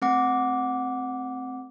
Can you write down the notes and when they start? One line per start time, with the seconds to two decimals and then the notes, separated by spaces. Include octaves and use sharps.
0.02 A3 C4 F#5 D6